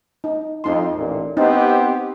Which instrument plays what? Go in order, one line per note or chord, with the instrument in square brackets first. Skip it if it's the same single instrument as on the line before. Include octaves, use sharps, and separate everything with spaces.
[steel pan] D#4
[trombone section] F2 [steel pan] D#4 C6
[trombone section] A1 A#2
[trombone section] B3 C4 G4 [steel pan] D#4